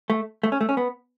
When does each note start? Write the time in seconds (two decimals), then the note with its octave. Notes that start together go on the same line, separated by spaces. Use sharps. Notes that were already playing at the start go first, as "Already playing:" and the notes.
0.10 A3
0.43 A3
0.52 C#4
0.61 A3
0.69 C#4
0.77 B3